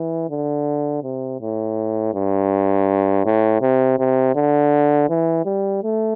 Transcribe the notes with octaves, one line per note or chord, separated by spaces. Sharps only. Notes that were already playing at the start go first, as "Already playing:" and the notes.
Already playing: E3
D3
C3
A2
G2
A2
C3
C3
D3
E3
G3
A3